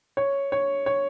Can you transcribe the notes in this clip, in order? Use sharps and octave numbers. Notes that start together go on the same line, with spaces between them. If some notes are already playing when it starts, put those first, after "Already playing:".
C#5
C#5
C#5